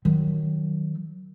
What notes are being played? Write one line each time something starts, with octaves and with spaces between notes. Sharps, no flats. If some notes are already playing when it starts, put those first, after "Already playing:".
D#3 F#3